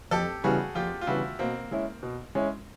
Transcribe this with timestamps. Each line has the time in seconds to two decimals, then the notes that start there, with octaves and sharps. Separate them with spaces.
0.11 F2 G4 A4
0.44 C#3 E3 G3 B3 F#4 G#4
0.75 F2 F4 G4
1.01 F4
1.07 C#3 E3 G3 B3 E4 F#4
1.39 B2 A#3 C4
1.71 G#3 C#4 E4
2.03 B2
2.35 G#3 C#4 E4